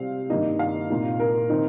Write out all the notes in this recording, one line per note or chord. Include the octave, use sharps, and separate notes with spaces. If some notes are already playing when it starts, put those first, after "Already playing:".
Already playing: C3 G3 C4 F5
G2 D#3 A#3 D#4 D#5
F5
C2 A#2 A#3 D#4
A#4
D#3 C4 D#4